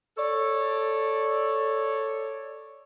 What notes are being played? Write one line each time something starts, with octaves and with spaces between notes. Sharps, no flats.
A4 C#5 D5